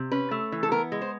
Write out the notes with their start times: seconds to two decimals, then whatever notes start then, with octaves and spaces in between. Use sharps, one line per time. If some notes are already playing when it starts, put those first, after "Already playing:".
Already playing: C3
0.12 C#4 B4
0.31 A3
0.52 E3
0.63 A4
0.71 B3 A#4
0.92 G#3
1.01 C5